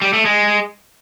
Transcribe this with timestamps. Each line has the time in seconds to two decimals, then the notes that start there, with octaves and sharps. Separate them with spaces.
0.02 G3
0.13 A3
0.25 G#3